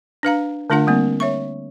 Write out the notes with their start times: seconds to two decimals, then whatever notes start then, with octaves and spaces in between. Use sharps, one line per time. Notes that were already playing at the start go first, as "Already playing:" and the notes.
0.23 D4 B4 F5 A#5
0.70 D3 A3 D4 F4 A#4 F#5
0.87 G3 A#3 C4
1.20 C#5 E5 C#6